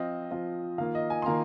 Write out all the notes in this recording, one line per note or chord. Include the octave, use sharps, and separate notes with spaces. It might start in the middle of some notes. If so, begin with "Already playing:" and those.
Already playing: F3 C4 F4 D#5
F3 C4 F4
D#3 A#3 F4 F5
D#5
G#5
C6
D#3 A#3 F4 A#5